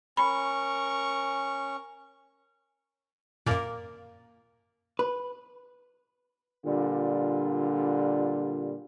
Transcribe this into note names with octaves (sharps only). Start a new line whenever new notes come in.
C#4 A#4 B5 C#6
F#2 A#2 A#3 A#4 D5
B4
A#2 D3 G3 F4